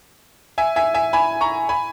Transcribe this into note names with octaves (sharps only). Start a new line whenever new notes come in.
E5 G#5
E5 G#5
E5 G#5
G#5 B5
A#5 C#6
G#5 B5